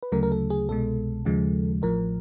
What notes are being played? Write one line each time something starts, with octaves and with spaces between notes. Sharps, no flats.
B4
D2 C#3 F#3 A3 A#4
A#4
A4
G#4
C2 B2 G#3 A4
D#2 C#3 F3 G#3
A1 A2 F3 A#4